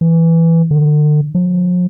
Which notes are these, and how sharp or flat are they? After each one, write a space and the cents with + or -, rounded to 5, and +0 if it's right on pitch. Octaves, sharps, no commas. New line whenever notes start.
E3 +5
D3 +35
F3 +45